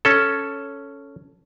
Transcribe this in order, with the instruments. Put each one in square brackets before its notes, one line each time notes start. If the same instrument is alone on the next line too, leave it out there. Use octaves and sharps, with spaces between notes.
[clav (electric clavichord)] C#4 A4